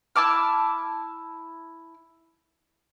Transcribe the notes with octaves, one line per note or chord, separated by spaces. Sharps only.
E4 A5 D6 F6